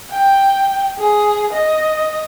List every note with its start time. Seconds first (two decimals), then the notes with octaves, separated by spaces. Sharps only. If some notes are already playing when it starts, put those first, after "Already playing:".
0.12 G5
0.98 G#4
1.53 D#5